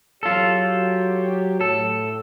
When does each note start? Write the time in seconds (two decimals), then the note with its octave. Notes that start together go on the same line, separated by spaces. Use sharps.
0.23 F#3 F4 G4 A4 C#5
1.61 A2 A4